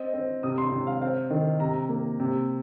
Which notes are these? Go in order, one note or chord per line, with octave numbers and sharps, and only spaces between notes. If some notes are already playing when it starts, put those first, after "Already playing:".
Already playing: C4 D#5
C4
C3 D#6
C6
C3
F5
C4 F5
D#3
C3 A#5
A#3
C3